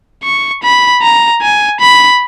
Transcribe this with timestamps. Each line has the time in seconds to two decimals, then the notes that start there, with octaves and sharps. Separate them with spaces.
0.24 C#6
0.63 B5
1.02 A#5
1.42 G#5
1.80 B5